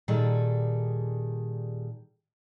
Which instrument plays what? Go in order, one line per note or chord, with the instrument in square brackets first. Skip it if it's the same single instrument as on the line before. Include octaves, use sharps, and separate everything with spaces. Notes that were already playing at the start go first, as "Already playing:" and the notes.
[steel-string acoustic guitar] A#2 D#3 G3 G#4 A4